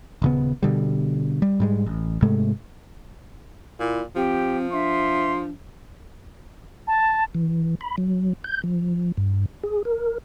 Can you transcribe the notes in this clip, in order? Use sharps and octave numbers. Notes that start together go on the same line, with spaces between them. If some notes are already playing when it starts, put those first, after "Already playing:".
D#1 C#3 B3
B2 D3 G3
G3
G#2 G3 G#3
A1
G#2 C3 G#3 A3
A#2 E4
F3 C4 G4
D4 E5 C6
A5
E3
B5
F#3
G6
F3
G2
G#4
A#4